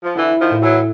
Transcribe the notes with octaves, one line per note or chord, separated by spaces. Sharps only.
F3
D3 E3 E4
D#3 F3
A2
E3 F#3